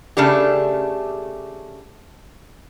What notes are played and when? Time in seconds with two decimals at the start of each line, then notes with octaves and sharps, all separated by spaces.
0.17 C#3 A3 D4 G4